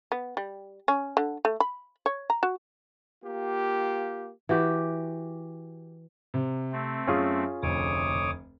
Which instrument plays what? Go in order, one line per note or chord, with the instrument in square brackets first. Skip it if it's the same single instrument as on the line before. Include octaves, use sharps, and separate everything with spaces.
[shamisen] B3
G3
C#4
D3
A3
B5
C#5
A#5
F#4
[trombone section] A#3 F4 G4
[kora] E3 F#4 G4
[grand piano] C3
[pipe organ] A3 C4
[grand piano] F#2 [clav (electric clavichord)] C#4 F4 G#4
[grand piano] F1 D2 [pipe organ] C#5 D6 D#6